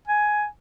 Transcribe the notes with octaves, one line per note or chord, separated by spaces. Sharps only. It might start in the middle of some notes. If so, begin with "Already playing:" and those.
G#5